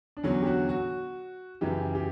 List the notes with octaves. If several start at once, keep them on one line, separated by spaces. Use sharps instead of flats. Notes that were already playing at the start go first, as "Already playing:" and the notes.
D4
E2 D3 F#3 C#4
G4
F#4
F#4
F#2 C#3 E3 G4
G4